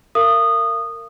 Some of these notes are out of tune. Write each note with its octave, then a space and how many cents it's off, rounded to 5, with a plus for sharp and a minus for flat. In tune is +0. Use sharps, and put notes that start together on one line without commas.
A#4 -25 F5 -40 D#6 -20